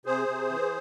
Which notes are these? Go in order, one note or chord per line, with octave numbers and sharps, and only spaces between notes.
C3 G#4 C5
C3
E3